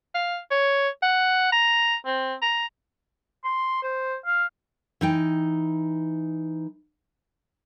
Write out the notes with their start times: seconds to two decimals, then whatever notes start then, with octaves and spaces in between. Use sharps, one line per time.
0.15 F5
0.51 C#5
1.02 F#5
1.52 A#5
2.06 C4
2.42 A#5
3.44 C6
3.83 C5
4.26 F5
5.01 E3 D#4 G5